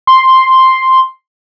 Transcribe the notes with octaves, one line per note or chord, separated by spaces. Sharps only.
C6